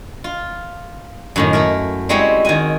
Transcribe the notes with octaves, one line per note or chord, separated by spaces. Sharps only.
F4
F#2 A2 D#3
A3 E4 A#4
G3 G#3 C4 E4 F#4 C#5
D#3 F#4 G#5